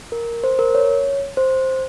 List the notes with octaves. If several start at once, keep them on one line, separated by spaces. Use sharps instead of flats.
A#4
C5
A#4
C#5
C5